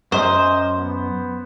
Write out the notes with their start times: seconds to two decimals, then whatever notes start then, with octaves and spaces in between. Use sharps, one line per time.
0.12 F#2 C5 D#5
0.77 B3